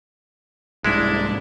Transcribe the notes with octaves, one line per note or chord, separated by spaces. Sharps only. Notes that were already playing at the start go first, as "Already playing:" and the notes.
C2 G#2 G#3 D4 E4